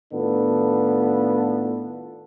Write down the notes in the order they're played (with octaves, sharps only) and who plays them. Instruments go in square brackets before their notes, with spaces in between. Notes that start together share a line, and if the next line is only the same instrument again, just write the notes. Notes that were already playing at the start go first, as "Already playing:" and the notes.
[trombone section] A2 D#3 B3 D4 F4 A4